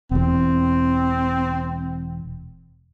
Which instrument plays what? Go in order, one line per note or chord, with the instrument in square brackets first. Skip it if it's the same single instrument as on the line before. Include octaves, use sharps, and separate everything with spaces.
[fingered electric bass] E1 E2 [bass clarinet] C4